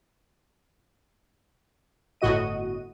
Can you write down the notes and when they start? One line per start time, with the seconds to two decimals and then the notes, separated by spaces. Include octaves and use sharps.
2.21 G1 A2 F#4 D#5 D#7